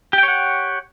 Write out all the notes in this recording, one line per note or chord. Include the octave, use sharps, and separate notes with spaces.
G4 C#5 F#5 G5